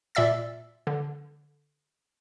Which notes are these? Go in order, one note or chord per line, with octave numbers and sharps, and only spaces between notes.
A#2 D5 E5 E6 A6
D3